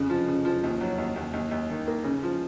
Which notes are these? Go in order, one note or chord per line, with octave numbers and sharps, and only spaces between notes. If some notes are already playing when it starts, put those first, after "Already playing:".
Already playing: F2 C#3
F3
C#3
F3
D#2
F#3
D#2
D#2
D#2
D#2
D#3
A#3
C#3
F3